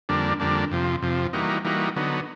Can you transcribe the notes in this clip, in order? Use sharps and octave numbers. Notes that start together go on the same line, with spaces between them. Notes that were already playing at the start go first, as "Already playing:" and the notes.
F2 D3 G3 A#3 D4
F2 D3 G3 A#3 D4
F2 C3 F3
F2 C3 F3
E3 G3 A#3 D#4 F#4
E3 G3 A#3 D#4 F#4
D3 F#3 B3 D#4